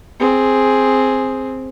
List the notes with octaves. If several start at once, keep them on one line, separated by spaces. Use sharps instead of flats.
C4 G#4